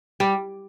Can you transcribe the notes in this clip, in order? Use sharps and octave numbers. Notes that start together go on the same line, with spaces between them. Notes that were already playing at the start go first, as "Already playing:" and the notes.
G3